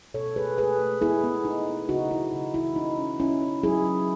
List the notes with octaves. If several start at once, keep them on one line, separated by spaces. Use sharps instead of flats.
B2 A4 C#5
A3 G#4 B4
A3 G#4 B4
A3
B3 E4 G#4
B3
D#4
B3
C#3 D#4 F#4
C#3 E4
C#3
D#4 E4
C#4 D#4
C#4
C#4 E4
C#4
F#3 E4 G#4
C#4